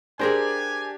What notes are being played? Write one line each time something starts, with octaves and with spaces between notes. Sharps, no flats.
D4 G4 G#4 A#4 C5 G#5